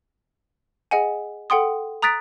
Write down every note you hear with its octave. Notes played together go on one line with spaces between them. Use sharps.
G#4 D#5 F#5 G#5
A4 F#5 G5 C6 D#6
A#5 D#6 F#6 A6 B6 D7